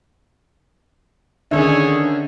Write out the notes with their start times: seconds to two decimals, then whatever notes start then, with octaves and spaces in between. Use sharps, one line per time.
1.51 D3 D#3 C#4 D#4 G#4 A4 C#5 E5